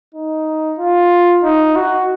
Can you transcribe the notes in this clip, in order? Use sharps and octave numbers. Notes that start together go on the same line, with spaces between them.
D#4
F4
D#4
F#4